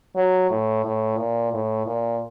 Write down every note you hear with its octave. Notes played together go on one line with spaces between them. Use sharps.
F#3
A2
A2
A#2
A2
A#2